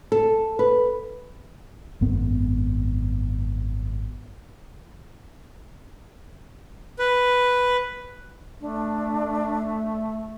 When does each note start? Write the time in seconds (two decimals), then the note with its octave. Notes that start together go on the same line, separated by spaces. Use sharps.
0.12 A4
0.59 B4
2.01 G#1 F#2 B3
6.99 B4
8.61 A3 D4